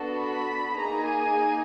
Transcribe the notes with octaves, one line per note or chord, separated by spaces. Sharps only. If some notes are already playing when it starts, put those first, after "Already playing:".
Already playing: B3 D4 F#4 A4
B5
A#3 D#4 G#4 A#5
G#5